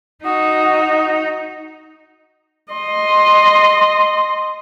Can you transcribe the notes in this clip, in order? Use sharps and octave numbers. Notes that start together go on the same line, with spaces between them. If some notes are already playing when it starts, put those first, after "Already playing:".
D#4 F#4 D#6
D#5 C6